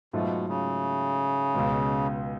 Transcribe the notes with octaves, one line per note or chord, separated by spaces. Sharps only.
G#2 B2 F#3 A3 F4
C#3
C#2 B2 G#3